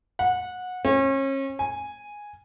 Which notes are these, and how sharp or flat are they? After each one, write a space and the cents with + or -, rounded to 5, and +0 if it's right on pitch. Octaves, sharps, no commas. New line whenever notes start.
F#5 -20
C#4 -35
G#5 -5